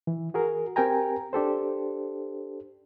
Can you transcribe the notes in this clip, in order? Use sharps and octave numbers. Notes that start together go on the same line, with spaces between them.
E3
F#4 G#4 A#4
C4 G4 A#4 G5 G#5 A#5
D4 G4 A4 C5